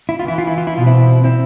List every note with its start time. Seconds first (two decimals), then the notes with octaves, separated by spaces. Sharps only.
0.09 E4
0.19 F4
0.26 E3 E4
0.38 F4
0.47 E4
0.58 F4
0.67 E4
0.75 B2 F4
0.86 C4 E4
1.24 C4 E4